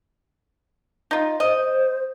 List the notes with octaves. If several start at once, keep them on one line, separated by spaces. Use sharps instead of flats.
D#4 F4
C5 D#5